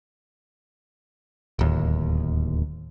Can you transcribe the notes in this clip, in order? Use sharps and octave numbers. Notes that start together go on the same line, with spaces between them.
D1 D#2